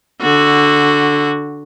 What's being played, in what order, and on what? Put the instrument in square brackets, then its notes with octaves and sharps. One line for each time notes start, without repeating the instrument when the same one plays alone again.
[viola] D3 F#4